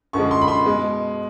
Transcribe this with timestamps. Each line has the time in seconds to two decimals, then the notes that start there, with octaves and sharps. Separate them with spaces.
0.13 F#2 D3 F3 G#3 C#6
0.31 C6
0.42 B5
0.48 C6
0.65 B2 G#3